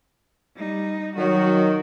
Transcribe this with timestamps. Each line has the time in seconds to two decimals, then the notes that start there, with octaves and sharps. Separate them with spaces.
0.56 G3 D#4
1.17 D#3 F#3 F#4